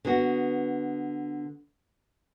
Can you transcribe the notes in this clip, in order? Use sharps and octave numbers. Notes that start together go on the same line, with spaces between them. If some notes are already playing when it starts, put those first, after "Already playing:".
D3 B3 F#4